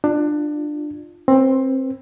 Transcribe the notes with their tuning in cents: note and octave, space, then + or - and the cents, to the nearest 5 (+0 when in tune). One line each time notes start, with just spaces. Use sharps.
D4 +20 F4 +0
C4 +20 B4 +0